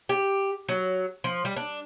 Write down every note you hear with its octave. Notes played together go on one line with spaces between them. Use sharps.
G4
F#3
F3
G3
D4